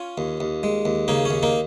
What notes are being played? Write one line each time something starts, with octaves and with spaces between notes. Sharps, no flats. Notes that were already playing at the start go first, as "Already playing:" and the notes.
Already playing: C#4 F4
D#2
D#2
G#3
D#2
C#3 A#3 D#4
C#4
D#2
A#3 D#4